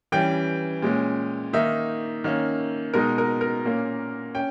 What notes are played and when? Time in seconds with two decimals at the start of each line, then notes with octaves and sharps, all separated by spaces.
0.12 E3 G3 C#4 G5
0.82 A#2 G#3 C#4
1.53 D#3 A#3 D#4 E5
2.24 D#3 A#3 C#4
2.94 B2 G#3 D#4 A#4
3.18 A#4
3.41 A#4
3.65 A#2 A#3 C#4
4.35 C#4 G5